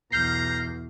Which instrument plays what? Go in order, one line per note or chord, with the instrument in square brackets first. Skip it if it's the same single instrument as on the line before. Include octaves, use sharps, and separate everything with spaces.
[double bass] B1 E2 [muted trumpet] A#5 [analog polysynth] F6 G6 C7